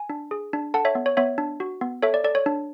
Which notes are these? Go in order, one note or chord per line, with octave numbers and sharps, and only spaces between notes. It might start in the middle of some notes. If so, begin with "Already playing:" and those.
Already playing: G#5
D4
G#4
D4
A4 F#5 A5
C#5 E5
B3
C#5
B3 C#5 E5
D4
F#4
B3
A4 C#5 E5
D5
A4 D5
C#5
D4